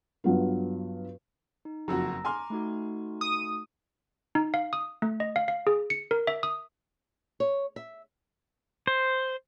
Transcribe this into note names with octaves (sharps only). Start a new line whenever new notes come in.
G2 F#3 B3 F4
D#4
F#1 F2 F#4 A#5 E6 A#6
G#5 A#5 C6 D6 F6
A3 D#4 F#4
D#6
D#4
F5
D#6
A3
D#5
F5
F5
G#4
C#7
A#4
E5
D#6
C#5
E5
C5